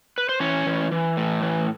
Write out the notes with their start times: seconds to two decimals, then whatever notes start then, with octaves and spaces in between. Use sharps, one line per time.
0.18 B4
0.29 C5
0.40 E3 C#4 C#5
0.66 E3
0.91 E3
1.17 A2
1.42 E3